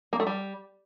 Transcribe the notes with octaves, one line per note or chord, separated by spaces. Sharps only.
A#3
A3
G3